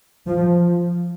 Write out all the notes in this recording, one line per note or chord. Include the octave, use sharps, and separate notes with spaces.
F3